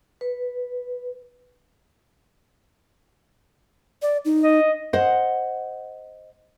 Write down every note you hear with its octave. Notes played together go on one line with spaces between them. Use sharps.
B4
D5
D#4
D#5
C5 D#5 F#5